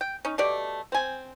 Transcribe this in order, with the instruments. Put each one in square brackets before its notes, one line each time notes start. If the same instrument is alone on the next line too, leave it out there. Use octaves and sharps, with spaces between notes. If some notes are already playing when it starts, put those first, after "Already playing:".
[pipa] G5
C#4 D#4
B2 A3 G4 D5
C4 G#5